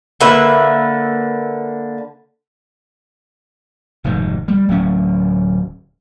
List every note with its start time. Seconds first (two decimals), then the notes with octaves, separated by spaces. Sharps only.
0.20 D3 A#3 B4 E5
4.04 F1 G#2 D#3
4.48 G3
4.69 D1 F#3 C#4